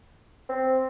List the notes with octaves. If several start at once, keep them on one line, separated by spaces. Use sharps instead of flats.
C4